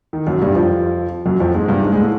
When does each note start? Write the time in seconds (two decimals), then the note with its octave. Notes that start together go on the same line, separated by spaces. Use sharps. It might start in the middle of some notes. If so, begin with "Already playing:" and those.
0.13 D#3
0.27 F#2 F#3
0.41 G2 G3
0.55 F2 F3
1.25 F#2 F#3
1.40 F2 F3
1.54 G#2 G#3
1.68 G2 G3
1.82 G#2 G#3
1.92 G#2 G#3
2.01 A2 A3